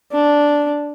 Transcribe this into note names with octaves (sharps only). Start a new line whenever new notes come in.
D4